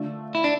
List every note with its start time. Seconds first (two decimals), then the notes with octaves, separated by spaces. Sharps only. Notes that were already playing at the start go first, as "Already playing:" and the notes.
Already playing: D3 A3 D4 F4
0.35 E4
0.44 D4